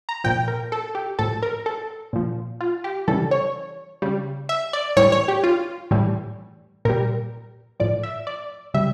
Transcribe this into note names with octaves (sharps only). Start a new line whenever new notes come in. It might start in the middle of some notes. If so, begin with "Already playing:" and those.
A#5
A#2 F3 G5
A#4
A4
G4
A2 F3 A4
A#4
A4
A#2 F3
F4
G4
C#3 E3 G3 A4
C#5
C#3 G3
E5
D5
A2 E3 G3 C#5
C#5
G4
F4
A2 E3 G3
A#2 G3 A#4
A2 F3 D5
E5
D5
C#3 G3 E5